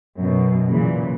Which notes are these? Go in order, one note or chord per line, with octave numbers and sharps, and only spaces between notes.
F#2 B2
A#2 C#3 E3 F#3